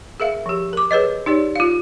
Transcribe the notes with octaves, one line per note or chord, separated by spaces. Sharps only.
G#4 A#4 E5 F5
F3 G4
A#4 D6
G#4 B4 C#5 D#5
D#4 G4 C#5 D5
F4 F5